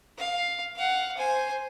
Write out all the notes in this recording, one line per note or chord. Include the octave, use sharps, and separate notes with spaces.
F5
F5 F#5
C5 G#5